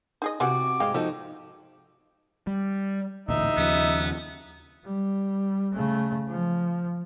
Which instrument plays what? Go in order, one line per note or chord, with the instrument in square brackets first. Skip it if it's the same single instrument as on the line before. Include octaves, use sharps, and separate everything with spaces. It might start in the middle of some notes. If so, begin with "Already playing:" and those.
[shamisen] D#4 G#4 D#5
[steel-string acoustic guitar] C3 F#4 [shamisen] E3 G4 F#5 [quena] D6
[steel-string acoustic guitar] G#2 G#3 [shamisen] D#5 F5 G5
[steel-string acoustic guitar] F3 D#4 F#4 [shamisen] A4
[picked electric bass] G3
[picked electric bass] A1 D2 A#2 [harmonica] D#4 E5
[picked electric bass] D#2 C#3 F3 [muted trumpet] B3
[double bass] G3
C#3 A3
F3